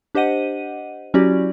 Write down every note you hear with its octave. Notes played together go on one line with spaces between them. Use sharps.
D4 G4 C5 D#5 F#5 D#7
F#3 C#4 E4 F#4 G4 D5